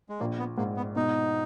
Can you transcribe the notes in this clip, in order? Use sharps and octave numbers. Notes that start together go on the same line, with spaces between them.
G#3
A#1 A#3
B3
G#2 A#3
B3
B2 D#4